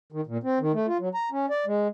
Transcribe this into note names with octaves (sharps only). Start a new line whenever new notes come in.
D#3
A#2
C4
D#3
A3
F4
F#3
A#5
C#4
D5
G#3